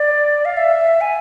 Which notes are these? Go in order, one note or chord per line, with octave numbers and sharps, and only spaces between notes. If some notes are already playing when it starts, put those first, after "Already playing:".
Already playing: D5
F5
E5
G#5